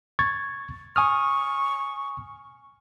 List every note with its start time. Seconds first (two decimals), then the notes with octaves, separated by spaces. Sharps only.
0.19 C#6 G#6 A6
0.96 G#5 C#6 D#6 F6